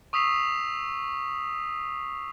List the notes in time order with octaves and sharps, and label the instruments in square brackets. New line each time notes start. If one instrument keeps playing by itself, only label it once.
[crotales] C#6 D#6 E6 B6 C7 F7